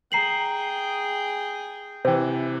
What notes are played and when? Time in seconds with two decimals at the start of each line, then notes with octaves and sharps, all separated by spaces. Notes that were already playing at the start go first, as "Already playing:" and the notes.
0.12 G#4 G5 A#5 C7 F#7
2.05 C3 E3 C5 G5